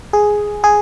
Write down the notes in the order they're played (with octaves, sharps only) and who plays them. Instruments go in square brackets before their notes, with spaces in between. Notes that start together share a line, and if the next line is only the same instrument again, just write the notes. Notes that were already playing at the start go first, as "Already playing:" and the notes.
[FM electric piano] G#4
G#4